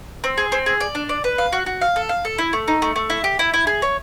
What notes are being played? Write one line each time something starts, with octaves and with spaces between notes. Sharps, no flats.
C4
G#4
C4
G#4
D5
D4
D5
B4
F5
F#4
F#4
F5
A4
F5
A4
E4
A3
D#4
A3
A3
E4
G4
E4
E4
G#4
C#5